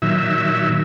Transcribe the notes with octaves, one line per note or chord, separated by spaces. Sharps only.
A#2 D#3 F#3 E5